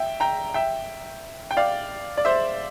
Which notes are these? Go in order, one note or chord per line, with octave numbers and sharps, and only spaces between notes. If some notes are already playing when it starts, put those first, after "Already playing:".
Already playing: E5 G5
G5 A#5
E5 G5
G5
D5 F5
D5
C5 E5